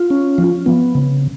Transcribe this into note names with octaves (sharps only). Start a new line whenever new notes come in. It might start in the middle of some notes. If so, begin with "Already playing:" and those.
Already playing: F4
C#4
F3
B3
C#3